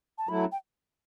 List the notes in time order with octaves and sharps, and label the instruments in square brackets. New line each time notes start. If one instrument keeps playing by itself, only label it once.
[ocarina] A5
[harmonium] F#3 A3 E4 [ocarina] B5
[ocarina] G5